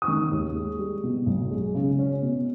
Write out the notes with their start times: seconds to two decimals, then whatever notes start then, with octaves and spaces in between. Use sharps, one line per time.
0.02 D#6
0.07 D#3 C#6
0.31 D#2
0.55 G#3
0.79 G3
1.04 B2
1.26 B1
1.51 G#3
1.75 C#3
1.99 C#4
2.22 B2